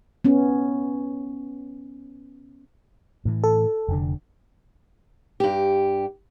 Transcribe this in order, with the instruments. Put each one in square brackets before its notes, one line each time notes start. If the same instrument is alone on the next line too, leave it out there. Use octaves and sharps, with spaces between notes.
[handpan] B3 C#4
[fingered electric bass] A2 E3
[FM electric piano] A4
[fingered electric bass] F1 D3
[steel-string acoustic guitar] G2 G4